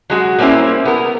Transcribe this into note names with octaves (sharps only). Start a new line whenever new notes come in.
F#3 G#3 F#4
G3 A#3 C4 C#4 E4
B3 A#4